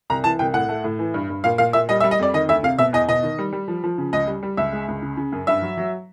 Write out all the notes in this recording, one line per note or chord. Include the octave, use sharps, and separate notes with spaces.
C2 A#5
E3 A5
C2 G5
A2 F#5
A3
A2
E3
G2
G2
A#2 F5
A#2 F5
A#2 E5
G3 D#5
E5
G3
D#5
F2 D5
D#3 D#5
D2 E5
C3 F5
B2 E5
E2 D#5
B2 D#5
D#3
G3
G3
F3
F3
C#3
C#2 D#5
G3
G3
C#2 E5
G#3
C#2
C#3
C#3
F#2
G2 E5
F#3
F#3